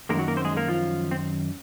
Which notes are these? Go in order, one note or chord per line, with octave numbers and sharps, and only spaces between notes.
F#2 D#3 G#3 A#3 A#4
F#3 F#4
A#3 A#4
C4 C5
G#3 G#4
A#3 A#4
F3 F4
C4